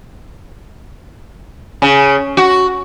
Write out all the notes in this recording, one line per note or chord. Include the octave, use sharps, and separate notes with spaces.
C#3
F#4